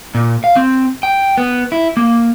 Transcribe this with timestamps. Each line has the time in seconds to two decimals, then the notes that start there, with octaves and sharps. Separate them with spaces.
0.15 A#2
0.44 F5
0.56 C4
1.03 G5
1.38 B3
1.72 E4
1.97 A#3